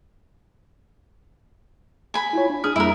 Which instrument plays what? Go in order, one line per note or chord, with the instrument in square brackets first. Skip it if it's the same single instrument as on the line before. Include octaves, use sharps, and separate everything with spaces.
[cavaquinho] G#5 B5
[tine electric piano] E4 F4 C#5
D4
[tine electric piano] G1 D4 F6 [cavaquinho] G#4
[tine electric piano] F2 G3 A#3 [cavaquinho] E4 A#4